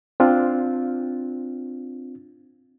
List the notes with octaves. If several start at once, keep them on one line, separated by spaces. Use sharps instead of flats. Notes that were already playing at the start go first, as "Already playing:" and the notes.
C4 D4 F4